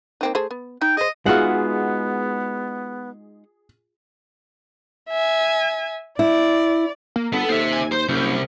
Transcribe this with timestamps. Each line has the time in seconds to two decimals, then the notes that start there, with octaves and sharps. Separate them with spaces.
0.21 A#3 C4 D#4
0.35 A3 G#4 C5
0.51 B3
0.81 D#4 G5
0.97 G#4 C5 D#5
1.26 G#3 B3 D#4 F4 F#4 G#4 E5 F#5
5.10 E5 G#5
6.19 E4 D5
7.16 A#3
7.33 G1 B3 A4
7.49 D#2 C5 E5
7.73 G#5
7.92 C5 G6
8.09 F#1 C2